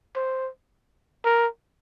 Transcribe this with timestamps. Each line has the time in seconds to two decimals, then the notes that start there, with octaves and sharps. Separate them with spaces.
0.16 C5
1.25 A#4